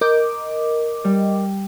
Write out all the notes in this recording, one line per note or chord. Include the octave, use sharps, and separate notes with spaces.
A#4 D#5 D6 G6
G3